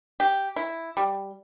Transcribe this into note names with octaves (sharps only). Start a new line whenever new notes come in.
G4
E4
G3